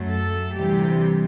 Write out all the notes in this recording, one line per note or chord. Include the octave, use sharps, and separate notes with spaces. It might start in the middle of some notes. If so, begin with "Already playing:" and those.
Already playing: F#2 F#3 A3
A4
D2 C3 E3 G3 G4